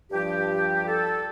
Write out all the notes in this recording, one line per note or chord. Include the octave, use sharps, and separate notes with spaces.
G2 F3 G4
A4